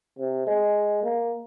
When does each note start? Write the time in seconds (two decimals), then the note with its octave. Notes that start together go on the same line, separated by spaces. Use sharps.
0.18 C3
0.47 G#3
1.03 A#3